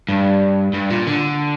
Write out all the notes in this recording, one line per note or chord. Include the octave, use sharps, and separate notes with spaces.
G2
G2
A#2
D3